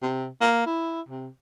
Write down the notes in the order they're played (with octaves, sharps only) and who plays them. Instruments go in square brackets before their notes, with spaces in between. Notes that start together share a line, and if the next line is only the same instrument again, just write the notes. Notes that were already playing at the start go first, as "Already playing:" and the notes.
[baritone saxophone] C3
A#3
E4
C3